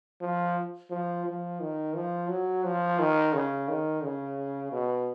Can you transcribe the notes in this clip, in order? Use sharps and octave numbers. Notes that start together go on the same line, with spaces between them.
F3
F3
F3
D#3
F3
F#3
F3
D#3
C#3
D#3
C#3
B2